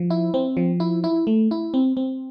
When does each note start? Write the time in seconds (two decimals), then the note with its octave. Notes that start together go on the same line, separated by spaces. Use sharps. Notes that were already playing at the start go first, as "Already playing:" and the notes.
Already playing: F3
0.10 E4
0.34 C4
0.57 F3
0.80 E4
1.04 E4
1.27 A3
1.51 E4
1.74 C4
1.97 C4